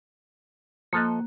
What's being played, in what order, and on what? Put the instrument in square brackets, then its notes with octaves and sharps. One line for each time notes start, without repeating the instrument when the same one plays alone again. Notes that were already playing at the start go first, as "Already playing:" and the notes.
[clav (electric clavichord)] F3 A4 D#5 [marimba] A#3 F#6